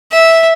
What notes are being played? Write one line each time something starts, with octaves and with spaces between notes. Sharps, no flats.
E5